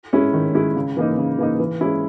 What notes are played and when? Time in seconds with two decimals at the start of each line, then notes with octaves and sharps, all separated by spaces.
0.13 G#3 C#4 E4
0.33 D#3
0.55 G#3 C#4 E4
0.76 C#3
0.97 E3 A#3 D#4
1.18 C#3
1.38 E3 A#3 D#4
1.59 E3
1.81 G#3 C#4 E4